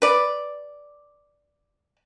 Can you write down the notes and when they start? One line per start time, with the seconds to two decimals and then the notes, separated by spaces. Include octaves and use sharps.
0.02 B4 D5